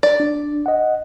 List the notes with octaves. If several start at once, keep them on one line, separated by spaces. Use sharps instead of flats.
D5
D4
D#5 F#5